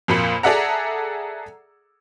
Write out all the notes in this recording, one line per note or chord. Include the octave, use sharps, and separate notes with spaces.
F2 A#2 A#3 F4 B5 C#7
G#4 A4 D5 E5 F#5 A#5